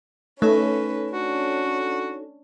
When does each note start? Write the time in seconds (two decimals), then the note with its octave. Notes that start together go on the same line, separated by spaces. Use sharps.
0.42 A3 C#4 D#4 A4 B4 C#5
1.12 C#4 D4 F#4